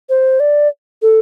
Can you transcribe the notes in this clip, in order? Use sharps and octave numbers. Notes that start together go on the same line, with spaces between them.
C5
D5
A4